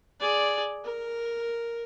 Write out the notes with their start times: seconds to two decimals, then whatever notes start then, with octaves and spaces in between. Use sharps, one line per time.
0.20 G#4 D5
0.84 A#4